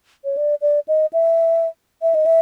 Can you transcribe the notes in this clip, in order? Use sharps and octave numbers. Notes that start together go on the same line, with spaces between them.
C#5
D5
D5
D#5
E5
E5
D#5
E5